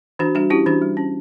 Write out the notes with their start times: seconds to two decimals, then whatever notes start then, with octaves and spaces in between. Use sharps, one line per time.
0.19 E3 D4 F#4
0.35 G3 D4 F#4
0.50 C#4 E4 G4
0.66 E3 D4 F#4
0.82 G3
0.97 C#4